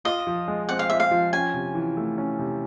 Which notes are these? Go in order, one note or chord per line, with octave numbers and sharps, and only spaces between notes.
F4 D#5
F3
G#3
C4 F#5
F5
F4 E5
F5
F3
C#4 G#5
C3
E3
A3
C#4
C3